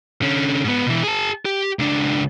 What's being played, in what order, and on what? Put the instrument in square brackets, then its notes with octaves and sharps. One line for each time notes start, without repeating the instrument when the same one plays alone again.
[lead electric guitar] D3 C#4
G#2 B3
B2 E3
G#4 A5
G4
C#2 D4